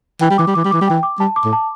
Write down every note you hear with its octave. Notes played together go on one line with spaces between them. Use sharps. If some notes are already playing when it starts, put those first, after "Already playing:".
E3 G5
G3
E3 D6
G3
E3 D6
G3
E3 D6
G3
E3 G5
D6
G3 A5
D6
A2
A5